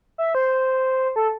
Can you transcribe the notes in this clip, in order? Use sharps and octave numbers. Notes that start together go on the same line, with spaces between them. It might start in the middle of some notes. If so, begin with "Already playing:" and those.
E5
C5
A4